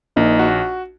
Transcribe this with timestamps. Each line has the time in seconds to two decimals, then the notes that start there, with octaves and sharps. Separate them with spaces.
0.16 A#1 A#3 D#4
0.39 F#4